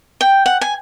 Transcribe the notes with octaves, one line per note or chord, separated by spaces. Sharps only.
G5
F#5
G#5